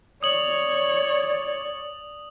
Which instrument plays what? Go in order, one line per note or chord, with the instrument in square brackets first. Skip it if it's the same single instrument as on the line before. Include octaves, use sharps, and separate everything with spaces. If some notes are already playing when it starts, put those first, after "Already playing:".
[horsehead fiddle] C#5 [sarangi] D5 [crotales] D#6 F#7